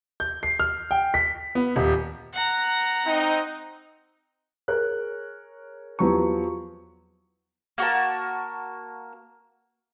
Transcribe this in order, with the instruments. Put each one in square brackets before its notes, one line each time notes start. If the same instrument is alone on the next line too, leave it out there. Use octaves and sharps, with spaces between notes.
[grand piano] G6
C7
F6
G5
B6
B3
D#1
[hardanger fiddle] F#5 A#5
[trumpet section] C4 D#4
[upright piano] G#4 A#4 C#5 F#6
E2 F3 F#3 B3 G4 C#6
[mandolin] A#3 F#4 A#4 A5